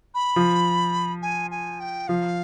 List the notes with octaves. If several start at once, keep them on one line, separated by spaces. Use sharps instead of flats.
B5
F3
G#5
G#5
G5
F3 F5